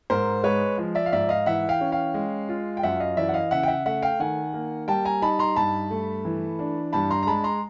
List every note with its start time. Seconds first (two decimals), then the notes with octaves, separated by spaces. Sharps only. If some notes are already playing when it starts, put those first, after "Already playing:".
0.10 G#2 A#4 C5
0.43 G#3 B4 C#5
0.78 F3
0.95 D5 E5
1.06 F5
1.12 G#2 D5 E5
1.29 D#5 F5
1.46 E3 E5 F#5
1.69 F5 G5
1.81 C#4
1.92 F5 G5
2.14 G#3
2.49 F4
2.77 G5
2.83 F#2 E5 F#5
3.00 D#5 F5
3.17 E3 D5 E5
3.29 F#5
3.34 D#5 F5
3.51 C#3 E5 F#5
3.63 G5
3.68 E5 F#5
3.86 A3 E5 F#5
4.02 F5 G5
4.20 D#3 F#5 G#5
4.53 A#3
4.88 G3 G5 A5
5.05 G#5 A#5
5.22 D#4 A5 B5
5.39 A#5 C6
5.56 G2 A5 B5
5.90 A3
6.25 E3
6.59 D4
6.93 G2 A5 B5
7.10 A#5 C6
7.23 A#5
7.27 G#3 A5 B5
7.44 A#5 C6